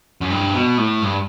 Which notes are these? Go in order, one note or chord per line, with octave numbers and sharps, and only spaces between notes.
F#2
G2
B2
A2
G2